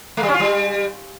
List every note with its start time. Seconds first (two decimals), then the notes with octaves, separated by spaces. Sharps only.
0.17 A3
0.23 G3
0.28 C#4
0.34 F4
0.40 G3